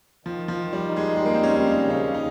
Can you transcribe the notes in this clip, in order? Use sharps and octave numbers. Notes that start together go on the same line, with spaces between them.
D#3 F3
F3
D#3
G3
D#4
G#3
G3 G#3
A#3
C4
C#4
D#2
D#4
C#3
C#4
C#3 D#4